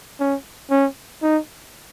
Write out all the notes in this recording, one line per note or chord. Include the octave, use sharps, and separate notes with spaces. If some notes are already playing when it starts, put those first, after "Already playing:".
C#4
C#4
D#4